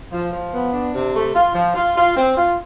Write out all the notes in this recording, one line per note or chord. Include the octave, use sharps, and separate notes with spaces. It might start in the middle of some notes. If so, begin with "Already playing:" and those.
F3
F3
B3
D4
C3
A3
F4
F3
F4
F4
C4
F4